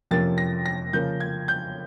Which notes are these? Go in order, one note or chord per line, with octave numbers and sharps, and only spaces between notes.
F2 C3 F3 A#3 C#4 A6
A#6
A#6
C#3 F3 A#3 C#4 G6
G#6
G6